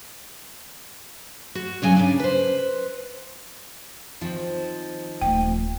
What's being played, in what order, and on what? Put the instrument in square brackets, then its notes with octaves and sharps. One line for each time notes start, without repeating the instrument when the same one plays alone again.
[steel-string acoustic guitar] F#4
G2 C#3 F#3 G#5
C#3 D4
B4 C5
D#3 F3 C4
[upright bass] D#1 A3 [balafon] G5